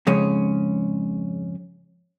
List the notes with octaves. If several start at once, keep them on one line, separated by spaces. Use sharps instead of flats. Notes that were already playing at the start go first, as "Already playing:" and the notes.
F2 G#2 C#3 G#3 C#4